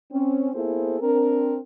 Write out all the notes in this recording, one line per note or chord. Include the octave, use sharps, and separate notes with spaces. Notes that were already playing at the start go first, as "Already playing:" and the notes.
C4 C#4
A#3 B3 E4 G#4 A4 C5
C4 D4 A#4